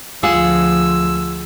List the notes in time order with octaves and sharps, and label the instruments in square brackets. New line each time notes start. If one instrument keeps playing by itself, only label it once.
[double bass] D2 F3 [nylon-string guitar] F4 [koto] G#4 F#5 [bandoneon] E6